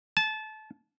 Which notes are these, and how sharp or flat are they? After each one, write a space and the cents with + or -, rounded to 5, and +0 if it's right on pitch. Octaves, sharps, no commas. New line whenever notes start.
A5 -25